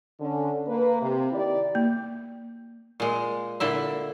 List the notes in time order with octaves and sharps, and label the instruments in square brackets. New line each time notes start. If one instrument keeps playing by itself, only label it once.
[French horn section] D3 C#4
A#3 B4
C3
D#3 E4 G4 D5
[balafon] A#3
[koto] A#2 G#3
A#2 D3 E4 E5